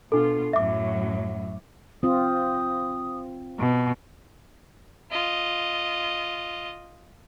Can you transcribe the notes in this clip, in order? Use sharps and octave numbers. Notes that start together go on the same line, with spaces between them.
B2 D4 F4 A4
F#2 A2 F#3 E5 D6
C4 F4 D#6
B2
F4 D#5